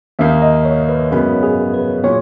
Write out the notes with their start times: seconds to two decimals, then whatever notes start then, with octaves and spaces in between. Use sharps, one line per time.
0.19 D#2 D#3 A#3 D#4 E5
0.42 D#5
0.65 C#5
0.89 B4
1.11 F#2 C#3 G#3 B3 F#4 A#4
1.43 G#4
1.74 B4
2.04 A#2 F#3 C#5